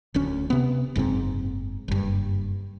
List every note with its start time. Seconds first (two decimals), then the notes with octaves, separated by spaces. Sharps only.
0.14 D1 D2 C#4
0.50 C3 B3
0.96 F#1 G#2 D3 C4
1.88 F#1 G2